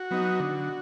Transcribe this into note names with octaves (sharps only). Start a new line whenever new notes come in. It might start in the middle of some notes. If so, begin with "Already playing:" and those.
Already playing: F#4
F#3 B3 D#4
D3